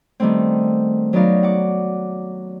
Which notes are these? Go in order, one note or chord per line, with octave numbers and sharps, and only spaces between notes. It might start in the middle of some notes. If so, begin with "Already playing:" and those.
D#3 G3 A3 B3 C4
F#3 B3 D#4 D5 F5
F#5 D6